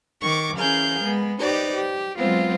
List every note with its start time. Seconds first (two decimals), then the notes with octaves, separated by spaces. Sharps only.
0.20 D#3 C#6 D6
0.56 E3 C#4 G#4 A#4 F5 G6
1.01 G#3 B3
1.38 D#4 G4 B4 C5 D5
1.73 G4
2.18 F#3 G#3 B3 C4 F4